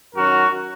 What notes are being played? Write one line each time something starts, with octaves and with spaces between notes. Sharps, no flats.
F#2 D#3 F#3 F#4 A#4